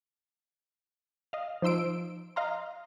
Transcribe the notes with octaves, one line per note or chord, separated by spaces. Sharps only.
D#5 F5
F3 D#4 C6 E6 D7
D#5 F5 A#5 C6